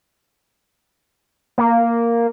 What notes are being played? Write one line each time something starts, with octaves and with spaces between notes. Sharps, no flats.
A#3